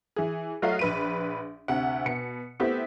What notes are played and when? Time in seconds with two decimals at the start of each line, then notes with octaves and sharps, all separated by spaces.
0.16 E3 G#4
0.62 F#3 A3 F4 F#4 D#5 F5
0.79 A#1 B4 D#7
1.68 D2 C3 F#5
2.06 B2 C#7
2.60 A3 B3 C4 E4 G4